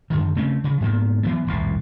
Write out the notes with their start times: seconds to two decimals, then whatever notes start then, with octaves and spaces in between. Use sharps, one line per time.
0.10 F#2 D3 D#3
0.35 C#3 A3 C4 C#4
0.64 C#3
0.81 G#2 F3 A#3 B3
1.23 E3 F#3 B3
1.47 D#1 C2 F2 A2